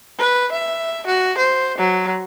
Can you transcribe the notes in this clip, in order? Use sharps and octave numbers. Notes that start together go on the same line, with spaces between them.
B4
E5
F#4
C5
F#3